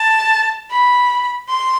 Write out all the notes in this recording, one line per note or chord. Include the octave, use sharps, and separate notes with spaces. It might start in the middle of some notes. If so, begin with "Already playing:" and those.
Already playing: A5
B5
C6